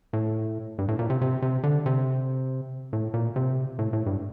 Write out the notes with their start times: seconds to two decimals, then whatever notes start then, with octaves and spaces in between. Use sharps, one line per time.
0.13 A2
0.78 G2
0.88 A2
0.99 A#2
1.10 C3
1.21 C3
1.42 C3
1.63 D3
1.86 C3
2.93 A2
3.14 A#2
3.36 C3
3.79 A2
3.93 A2
4.06 G2